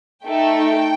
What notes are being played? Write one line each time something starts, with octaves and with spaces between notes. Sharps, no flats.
A3 D#4 A4 G5